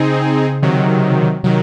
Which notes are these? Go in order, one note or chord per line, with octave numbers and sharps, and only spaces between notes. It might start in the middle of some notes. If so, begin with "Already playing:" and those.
Already playing: C#3 C4 D#4 G#4
C3 D#3 F#3
C3 D#3 F#3